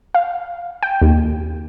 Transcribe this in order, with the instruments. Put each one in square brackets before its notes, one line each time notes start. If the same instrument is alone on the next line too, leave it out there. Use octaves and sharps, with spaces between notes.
[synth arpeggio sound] F5
G5
D#2